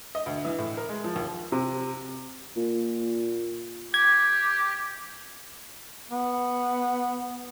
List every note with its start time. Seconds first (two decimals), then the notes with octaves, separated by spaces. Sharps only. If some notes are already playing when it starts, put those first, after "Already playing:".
0.15 D#5
0.26 D2
0.45 E3
0.58 A2
0.77 A#4
0.89 G#3
1.04 F3
1.16 D#2
1.52 C3
2.57 A#2
3.94 G4 G#6
6.11 B3